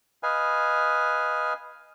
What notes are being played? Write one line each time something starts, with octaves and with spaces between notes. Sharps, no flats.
B4 D#5 F5 G#5